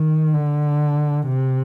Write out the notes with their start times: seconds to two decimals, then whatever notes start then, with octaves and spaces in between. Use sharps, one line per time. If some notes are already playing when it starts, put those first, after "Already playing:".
Already playing: D#3
0.33 D3
1.26 C3